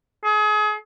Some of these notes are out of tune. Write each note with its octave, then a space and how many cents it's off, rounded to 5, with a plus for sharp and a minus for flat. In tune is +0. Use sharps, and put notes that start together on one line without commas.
G#4 +35